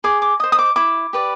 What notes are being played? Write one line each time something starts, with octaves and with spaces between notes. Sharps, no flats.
G#4 D6
D6
C5 D#5 D#6
D#6
D6
E4 D6
G4 B4 D5